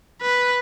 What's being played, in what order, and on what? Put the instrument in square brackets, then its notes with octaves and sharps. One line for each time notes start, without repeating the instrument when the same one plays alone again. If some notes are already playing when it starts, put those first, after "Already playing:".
[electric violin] B4